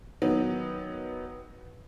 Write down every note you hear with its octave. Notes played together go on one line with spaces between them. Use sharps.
D#3 F#3 B3